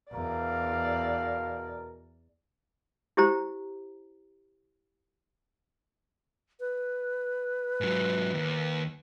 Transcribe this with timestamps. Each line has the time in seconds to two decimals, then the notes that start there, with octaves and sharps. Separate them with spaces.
0.12 E2 B2 A#4 D5 F5
3.17 E4 G4 C5 A#5
6.60 B4
7.81 G#2 F#3
8.34 D#2